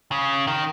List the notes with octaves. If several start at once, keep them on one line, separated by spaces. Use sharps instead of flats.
C#3
D#3